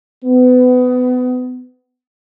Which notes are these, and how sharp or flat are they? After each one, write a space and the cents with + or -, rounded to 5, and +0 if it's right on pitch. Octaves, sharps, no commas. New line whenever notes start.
B3 +25